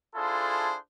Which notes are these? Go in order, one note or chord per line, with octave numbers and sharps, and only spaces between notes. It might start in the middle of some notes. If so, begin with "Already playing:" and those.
D4 E4 F4 G#4 A4 C5